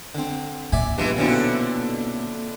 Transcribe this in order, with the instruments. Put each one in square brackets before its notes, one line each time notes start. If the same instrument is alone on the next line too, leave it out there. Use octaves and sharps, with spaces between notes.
[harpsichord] D3 C4
[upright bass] A#2 [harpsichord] D5 E5 G#5
[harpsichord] G2 F3 A5 [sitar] E3 G#3 B3
[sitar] F2 D3 E4 [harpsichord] B2 C#4